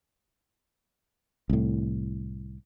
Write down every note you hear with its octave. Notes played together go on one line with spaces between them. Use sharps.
C2 A2